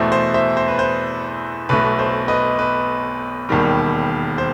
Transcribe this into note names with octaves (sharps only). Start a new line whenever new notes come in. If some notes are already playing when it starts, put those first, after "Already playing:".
Already playing: E2 B2 A3 C5
C5
C5 E5
C5
B4
C5
B1 B2 A3 B4
C5
B4 D#5
B4
E1 D#2 D#3 G3
C5